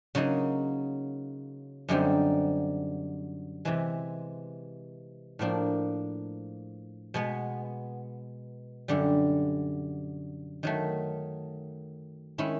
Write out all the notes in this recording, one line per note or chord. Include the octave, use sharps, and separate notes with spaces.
C#3 F#3 A#3 D#4
F#2 D3 G3 C4 D#4
C3 E3 G#3
A2 F3 A#3 D4
B2 G#3 B3
F#2 D3 G3
D#3 F#3 A3
D#3 G#3 C#4 E4